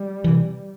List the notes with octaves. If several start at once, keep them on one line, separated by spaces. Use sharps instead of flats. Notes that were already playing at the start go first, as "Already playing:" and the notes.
Already playing: G3
C3 E3